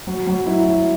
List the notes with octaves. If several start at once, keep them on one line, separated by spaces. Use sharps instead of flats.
F#3
F#3
E4
F#3